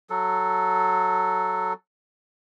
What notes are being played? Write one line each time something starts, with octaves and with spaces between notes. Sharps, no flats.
F#3 A4